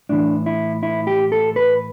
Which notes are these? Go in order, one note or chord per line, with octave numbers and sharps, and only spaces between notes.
A2 E3 D4
E4
E4
G4
A4
B4